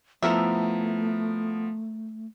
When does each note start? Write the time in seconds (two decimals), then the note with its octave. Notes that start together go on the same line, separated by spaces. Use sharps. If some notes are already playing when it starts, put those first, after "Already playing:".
0.22 F3 A3 B3 E4 A4 A#4 E5